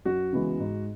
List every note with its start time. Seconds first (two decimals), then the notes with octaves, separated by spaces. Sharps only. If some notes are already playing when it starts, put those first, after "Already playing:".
0.05 F#2 F#4
0.33 C#3 E3 G#3 B3
0.60 G#2